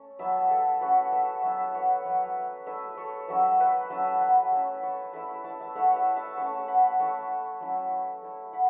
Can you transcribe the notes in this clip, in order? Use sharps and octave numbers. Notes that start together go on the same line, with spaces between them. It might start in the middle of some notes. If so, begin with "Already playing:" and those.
Already playing: A3 C#4
F#3 B3 E4 E5 A5
A4
A3 C#4 E4 F#4 B4
B4 E5
F#3 B3 E4 E5 A5
C#5 F#5
F#3 B3 E4 B4 E5
A3 E4 B4 E5
A4 C#5
F#3 C#4 E4 B4 E5
B4 E5
F#3 C#4 E4 E5 A5
F#5 B5
A3 C#4 E4
A5 C#6
A3 E4 B5 E6
A5 C#6
E5 A5
A3 E4 C#5 F#5
B4 E5
E5 A5
A3 C#4 E4 A5 C#6
F#5 B5
A3 E4 A5 C#6
F#3 C#4 E4
A3 E4
F#5 B5